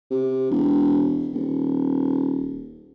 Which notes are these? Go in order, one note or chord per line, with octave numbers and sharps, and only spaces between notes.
C3
E1
D#1